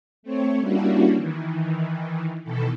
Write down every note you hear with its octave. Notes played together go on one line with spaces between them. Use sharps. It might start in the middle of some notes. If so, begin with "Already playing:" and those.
A3 C4 C#5
G3 A#3 C#4 D4 E4 F#4
D#3 E3
B2 D#3 E3 A4